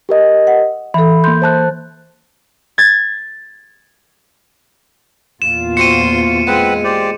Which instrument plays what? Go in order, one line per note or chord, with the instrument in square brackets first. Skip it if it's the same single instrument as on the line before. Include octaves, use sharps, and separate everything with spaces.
[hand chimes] G4 A#4 D#5
[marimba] F#5
[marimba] E3 A4 [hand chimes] B5
[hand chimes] A#3 G6 [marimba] C6
[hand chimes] C5 A5 F#6
[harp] G#6 A6
[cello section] E2 A#2 F4 [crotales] E7
[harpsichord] C4 F#4 [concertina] C6 [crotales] C#7 D#7
[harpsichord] G#3 [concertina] C4 B4 F#5
[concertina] G4 C5 D5